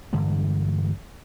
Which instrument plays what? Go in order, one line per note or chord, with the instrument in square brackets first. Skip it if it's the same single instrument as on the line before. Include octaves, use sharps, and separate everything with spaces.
[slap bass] G2 D3 E3 G#3